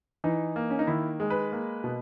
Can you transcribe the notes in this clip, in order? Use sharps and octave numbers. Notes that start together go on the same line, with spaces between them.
E3 D#4
A#3
C#4
D#4
D#3 E4
G#3
B4
A#3
B2